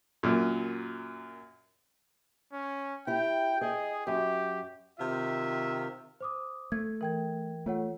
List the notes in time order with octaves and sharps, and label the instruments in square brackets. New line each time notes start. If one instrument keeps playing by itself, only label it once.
[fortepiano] F#2 A#2
[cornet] C#4
[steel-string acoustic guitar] E4 G4 [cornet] G5
[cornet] G#4 [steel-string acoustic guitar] D#5
[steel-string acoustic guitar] F#2 [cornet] G4
[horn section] C3 D#3 F4 E5
[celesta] C5 D6 D#6
[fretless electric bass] A3 [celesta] G#6
[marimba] E3 [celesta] A#4 G5 G#6
[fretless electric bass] A3 [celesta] F4 C#5 F#5